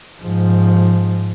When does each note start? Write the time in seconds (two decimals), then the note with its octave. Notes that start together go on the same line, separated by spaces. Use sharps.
0.23 G#2 F3